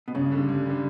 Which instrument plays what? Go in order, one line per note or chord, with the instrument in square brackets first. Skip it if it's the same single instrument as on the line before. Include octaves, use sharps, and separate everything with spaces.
[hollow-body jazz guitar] B2
[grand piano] G2 [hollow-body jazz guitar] C#3
[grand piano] D3 G3
G2
D3 G3